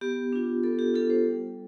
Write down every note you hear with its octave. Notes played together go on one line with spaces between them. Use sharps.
B3 G4
D4 F4
B3 A4
G4
D4 F4 A4
C5
G3